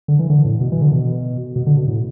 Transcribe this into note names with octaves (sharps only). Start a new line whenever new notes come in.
D3
E3
D3
A2
B2
E3
D3
B2
B2
D3
B2
A2